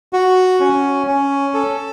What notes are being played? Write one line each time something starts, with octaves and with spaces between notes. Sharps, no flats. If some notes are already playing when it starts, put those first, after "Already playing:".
F#4
C#4
C#4
A4